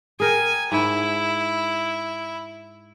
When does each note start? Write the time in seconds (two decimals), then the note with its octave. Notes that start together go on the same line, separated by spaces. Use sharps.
0.20 G#4 A#4 G5 G#5
0.72 G#2 E4